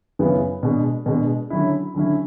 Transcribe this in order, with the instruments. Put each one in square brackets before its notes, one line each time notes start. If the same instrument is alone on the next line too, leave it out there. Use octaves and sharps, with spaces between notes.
[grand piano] F#2 C#3 E3 B3
B2 G#3 D4
B2 G#3 D4
D3 F#3 C#4 E4
D3 F#3 C#4 E4